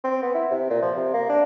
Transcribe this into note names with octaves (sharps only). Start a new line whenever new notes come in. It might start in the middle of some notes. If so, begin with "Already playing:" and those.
C4
B3
E4
C3
A#2
F3
C3
A#3
D4